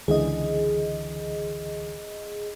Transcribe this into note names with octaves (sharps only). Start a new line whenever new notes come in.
C#2 D3 E3 G#4 D#5